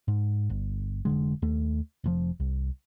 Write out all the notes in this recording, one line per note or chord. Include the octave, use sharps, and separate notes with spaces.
G#2
G1
F1 E2 D3 G#3
D#2 A3
F1 G#2 F3
C2